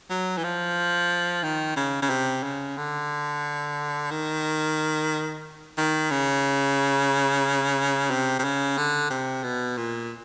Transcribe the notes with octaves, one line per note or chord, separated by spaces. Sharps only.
F#3
E3
F3
D#3
C#3
C#3
C3
C#3
D3
D#3
D#3
C#3
C3
C3
C#3
D3
C3
B2
A#2